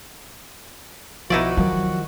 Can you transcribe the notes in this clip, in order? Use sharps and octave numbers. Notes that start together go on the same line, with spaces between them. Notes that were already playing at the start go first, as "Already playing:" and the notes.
B1 F3 D#4 E4 F#4 D5
D#3 F3 F#3